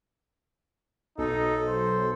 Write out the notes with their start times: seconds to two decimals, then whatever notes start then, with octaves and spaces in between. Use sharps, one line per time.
1.18 B1 D#4 A4
1.68 C5